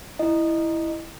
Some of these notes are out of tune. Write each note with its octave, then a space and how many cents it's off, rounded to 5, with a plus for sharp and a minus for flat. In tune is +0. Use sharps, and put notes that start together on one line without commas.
E4 +0 D#5 -15